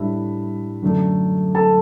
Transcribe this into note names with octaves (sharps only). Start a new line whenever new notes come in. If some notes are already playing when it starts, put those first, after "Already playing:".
Already playing: A2 G3 D4 E4 E5
F#2 D3 A3
A4 A5